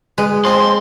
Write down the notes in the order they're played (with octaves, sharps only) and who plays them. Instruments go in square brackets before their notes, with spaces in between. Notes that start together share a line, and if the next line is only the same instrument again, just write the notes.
[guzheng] G#3 [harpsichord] B4
[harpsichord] F3 C4 [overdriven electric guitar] C6